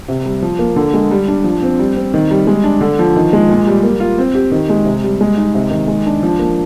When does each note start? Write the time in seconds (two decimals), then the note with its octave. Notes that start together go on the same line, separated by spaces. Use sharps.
0.09 C3
0.26 G3
0.42 F3
0.59 A#3
0.76 D3
0.94 G#3
1.11 G3
1.28 D4
1.44 F3
1.62 C4
1.79 G3
1.97 C4
2.14 D#3
2.31 G3
2.47 G#3
2.64 D4
2.81 D3
2.99 F3
3.16 D#3
3.33 G#3
3.49 A#2
3.67 G3
3.84 A#3
4.00 F4
4.18 C4
4.35 G4
4.52 D#3
4.69 G#3
4.85 C3
5.04 G3
5.21 G#3
5.37 D#4
5.55 C3
5.71 D#3
5.88 G#3
6.06 D4
6.23 F3
6.39 A#3